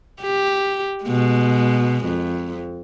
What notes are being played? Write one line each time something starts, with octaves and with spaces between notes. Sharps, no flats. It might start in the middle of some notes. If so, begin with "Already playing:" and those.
G4
B2 G#3
F2